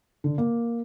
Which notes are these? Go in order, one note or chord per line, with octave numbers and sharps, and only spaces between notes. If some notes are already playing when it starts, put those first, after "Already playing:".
D3
A#3